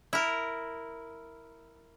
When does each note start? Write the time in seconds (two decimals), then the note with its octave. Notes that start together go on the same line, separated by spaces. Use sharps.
0.13 E4 A#4